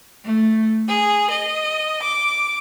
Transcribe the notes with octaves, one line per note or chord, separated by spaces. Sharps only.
A3
G#4
D#5
D6